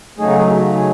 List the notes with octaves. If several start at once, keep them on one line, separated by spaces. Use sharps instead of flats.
C#3 F#3 A3 D#4 G#4
F#4
G#4
F#4
G#4